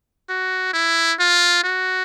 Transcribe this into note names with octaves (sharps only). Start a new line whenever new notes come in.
F#4
E4
F4
F#4